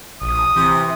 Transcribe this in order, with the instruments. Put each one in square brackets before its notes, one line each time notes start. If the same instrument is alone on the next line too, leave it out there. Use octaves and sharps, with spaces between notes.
[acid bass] A#1 [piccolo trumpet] D#6
[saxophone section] C3 [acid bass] E3